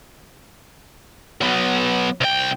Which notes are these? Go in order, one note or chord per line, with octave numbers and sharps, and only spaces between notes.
F#3 B3
C2 G5